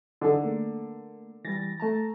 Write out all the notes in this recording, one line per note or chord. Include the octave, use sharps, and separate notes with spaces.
D3 D#4 G#4 A4
A3 A#3 A#4
E3 G3 A6 A#6
A3 A5 A#5